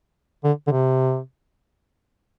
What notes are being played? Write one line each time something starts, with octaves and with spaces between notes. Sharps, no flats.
D3
D3
C3